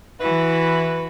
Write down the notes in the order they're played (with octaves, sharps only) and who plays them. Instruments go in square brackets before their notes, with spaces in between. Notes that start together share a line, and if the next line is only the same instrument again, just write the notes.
[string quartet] E3 E4 F#4 [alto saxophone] B4